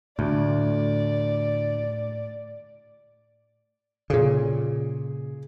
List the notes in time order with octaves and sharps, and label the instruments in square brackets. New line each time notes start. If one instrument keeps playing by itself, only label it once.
[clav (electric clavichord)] D2 [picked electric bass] A2 [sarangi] D5
[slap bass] A#2 C#3 [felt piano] G#4